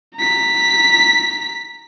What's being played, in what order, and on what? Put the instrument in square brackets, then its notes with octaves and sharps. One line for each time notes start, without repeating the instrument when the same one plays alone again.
[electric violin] A#5 B6